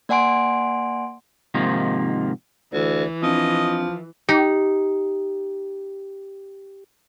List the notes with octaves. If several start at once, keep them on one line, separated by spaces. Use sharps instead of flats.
A#3 D5 F#5 G#5 C6 D7
G#2 C3 D#3 F3 A#3
D2 E3
F3 C4 D4 D#5
D#4 G4